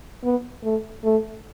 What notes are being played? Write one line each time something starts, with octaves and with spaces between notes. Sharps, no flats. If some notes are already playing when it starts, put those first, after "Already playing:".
B3
A3
A3